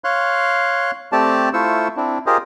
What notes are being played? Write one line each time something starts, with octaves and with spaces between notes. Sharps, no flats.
C#5 F5 C6 F#6
A3 C4 G4 D5 A5
A3 E4 F4 C5 C#6 E6
C4 D4 E4
F4 G4 G#4 A#4 C5 D#5